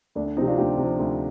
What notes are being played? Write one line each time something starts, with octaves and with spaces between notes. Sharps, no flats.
D2 D4
D4
C3 F3 C4 D#4
D4 F4
D2 D#4 G4
C3
F3
D2